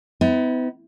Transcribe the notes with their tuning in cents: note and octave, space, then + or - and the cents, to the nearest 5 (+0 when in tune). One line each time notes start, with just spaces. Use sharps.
B3 +40 E4 -40